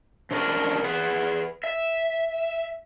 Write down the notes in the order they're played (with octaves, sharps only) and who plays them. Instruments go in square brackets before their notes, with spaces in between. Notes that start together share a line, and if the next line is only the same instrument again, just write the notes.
[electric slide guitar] C3 C#4 D4 A#4
G#4 B4 F#5
E5